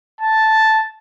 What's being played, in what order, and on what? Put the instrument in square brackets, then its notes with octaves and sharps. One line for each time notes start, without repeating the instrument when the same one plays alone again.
[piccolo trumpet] A5